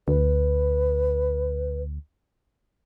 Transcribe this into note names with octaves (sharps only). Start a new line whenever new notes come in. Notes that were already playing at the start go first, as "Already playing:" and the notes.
D2 B4